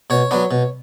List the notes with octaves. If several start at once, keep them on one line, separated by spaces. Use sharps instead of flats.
B2 C#5
F#3 B3 D4
B2